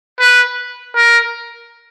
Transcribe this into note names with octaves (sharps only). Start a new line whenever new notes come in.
B4
A#4